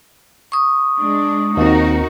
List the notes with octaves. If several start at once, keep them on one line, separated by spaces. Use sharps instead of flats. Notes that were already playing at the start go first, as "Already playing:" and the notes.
C#6 D#6
G#3 D4
D#2 C4 D#4 F#4 A#4